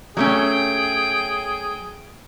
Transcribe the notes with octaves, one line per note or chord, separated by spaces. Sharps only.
F#3 A3 C#4 G#4 G5